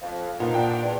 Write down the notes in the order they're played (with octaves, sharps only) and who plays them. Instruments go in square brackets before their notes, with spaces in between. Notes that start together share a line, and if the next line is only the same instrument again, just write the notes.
[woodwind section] F2 [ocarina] F5
[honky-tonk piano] A#2 [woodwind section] B3 D4 D#4 [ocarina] F#5
[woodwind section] D4 [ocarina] D5 [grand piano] G5
[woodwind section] E2